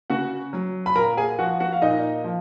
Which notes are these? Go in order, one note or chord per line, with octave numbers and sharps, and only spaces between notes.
C#3 F#4 F#5
F#3
B5
A#2 A#4 A#5
G#4 G#5
F3 F#4 F#5
F#4 F#5
F5
A#2 D#4 D#5
F3